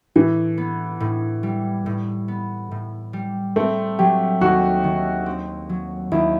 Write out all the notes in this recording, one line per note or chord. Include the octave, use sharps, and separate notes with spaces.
A2 E3
B3
A2
G3
A2
B3
A2
G3
A3 C4
F#3 G4
D#2 F#4
D#3
C4
F#3
D#2 E4